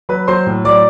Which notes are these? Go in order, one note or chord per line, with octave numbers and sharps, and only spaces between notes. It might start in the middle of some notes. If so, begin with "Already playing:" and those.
F#3 B4 B5
F#3 C5 C6
A2
F#3 D5 D6